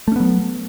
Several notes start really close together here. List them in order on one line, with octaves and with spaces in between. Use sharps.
A3 C#4 B3 F#3